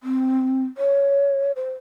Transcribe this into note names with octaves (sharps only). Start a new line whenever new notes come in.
C4
C#5
C5